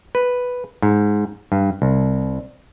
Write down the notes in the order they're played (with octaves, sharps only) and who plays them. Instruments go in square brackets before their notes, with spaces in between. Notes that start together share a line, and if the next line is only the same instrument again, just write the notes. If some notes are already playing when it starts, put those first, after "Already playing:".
[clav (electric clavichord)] B4
G#2
G2
C2